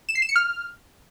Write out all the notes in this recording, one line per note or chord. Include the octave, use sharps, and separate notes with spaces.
E7
C7
E7
C#7
F6